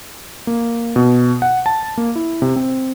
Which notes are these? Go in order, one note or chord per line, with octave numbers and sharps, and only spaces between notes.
A#3
B2
F#5
A5
A#3
E4
C3
C4